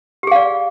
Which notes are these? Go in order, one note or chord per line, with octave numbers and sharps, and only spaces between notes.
G4 G#4 D5 F5